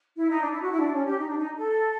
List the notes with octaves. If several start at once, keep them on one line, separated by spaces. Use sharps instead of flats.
E4
D#4
D4
E4
F#4
E4
D4
C#4
G4
D#4
D4
D#4
A4